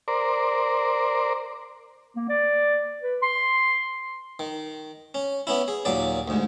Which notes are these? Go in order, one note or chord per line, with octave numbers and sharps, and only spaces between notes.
A#4 C5 D5
A#3
D5
B4
C6
D#3
C#4
B3 C#4 E4
G#4
D#2 A#2 F#3 D5
D2 G#2